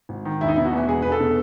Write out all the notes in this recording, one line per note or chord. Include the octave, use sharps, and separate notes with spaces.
G#1
D#3
E1 E4
D#4
B2 E4
F#4
E2
E1 G#4
E1 B4
A4
B2